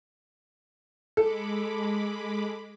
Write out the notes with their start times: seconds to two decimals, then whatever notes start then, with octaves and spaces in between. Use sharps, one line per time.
1.17 G#3 A4 B5 D6